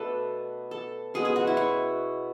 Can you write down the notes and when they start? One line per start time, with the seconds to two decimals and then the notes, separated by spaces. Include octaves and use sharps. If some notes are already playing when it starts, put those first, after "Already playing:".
Already playing: B2 A3 D4 A4 B4
0.71 A4
1.14 B2 G#3 C#4 G#4
1.25 G#4
1.36 F#4
1.47 E4
1.57 C#5